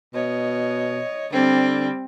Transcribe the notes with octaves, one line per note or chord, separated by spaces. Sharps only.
B2 C#5 D#5
D3 G3 C4 D5